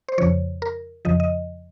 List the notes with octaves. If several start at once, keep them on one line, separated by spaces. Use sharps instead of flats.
C5
F2 C#3 F3 C#5
A#4
F2 C#3 F3 D#5
D#5